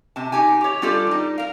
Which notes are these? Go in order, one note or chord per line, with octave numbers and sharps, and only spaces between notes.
C3 A5
D#4 G4 G#5
G4 C#5
G3 D4 F4 G4 A4 D5
G3 D#4
A#4 F5